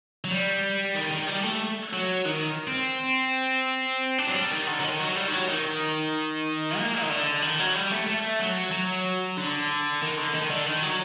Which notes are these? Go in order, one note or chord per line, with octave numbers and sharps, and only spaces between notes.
F#3
G3
D#3
D#3
G3
A3
F#3
D#3
C4
D4
F#3
G3
D#3
D3
F#3
D#3
F#3
G3
D#3
F#3
D#3
A#3
D#3
D3
D#3
F#3
G3
A3
A3
F#3
F#3
D3
D#3
D3
D#3
D3
D#3
F#3